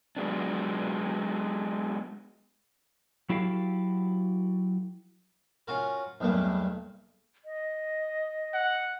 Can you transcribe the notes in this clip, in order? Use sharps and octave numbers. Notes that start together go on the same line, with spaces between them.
F#3 G#3 B3 D4
F#3 E4 F#4 G4 A4 F5
C#4 F4 F#4 A#4
B1 E2 G2 A3 A#3
D#5
F#5